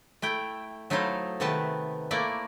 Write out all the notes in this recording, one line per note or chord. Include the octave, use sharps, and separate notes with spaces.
A3 E4 G5
F#3 A3 D#4 E4 C5 F5
C3 D#3 A3 B3 B4 A5
A3 A#3 E4 D5